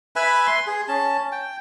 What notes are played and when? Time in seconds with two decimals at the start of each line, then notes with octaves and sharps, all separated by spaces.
0.16 B4 E5 G#5 B5
0.47 C6
0.67 G#4
0.88 C#4 A5
1.32 G5